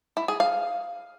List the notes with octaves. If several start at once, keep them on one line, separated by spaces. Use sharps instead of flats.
E4
G#4
F5